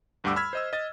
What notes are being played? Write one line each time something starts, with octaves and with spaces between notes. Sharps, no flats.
D2 G2 G3 F#5 D6 E6
B5 E6 F6 G#6 B6
C5 D#5 E6
D#5 A6